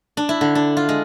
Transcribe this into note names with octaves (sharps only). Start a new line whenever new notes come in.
D4
E4
D3
D4
F4
G#3